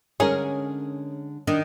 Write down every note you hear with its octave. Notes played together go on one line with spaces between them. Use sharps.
D3 G#3 C#4 G#4 A#4
D#3 D4